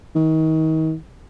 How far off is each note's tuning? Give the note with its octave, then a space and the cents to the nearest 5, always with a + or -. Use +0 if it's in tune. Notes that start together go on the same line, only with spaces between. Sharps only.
D#3 +35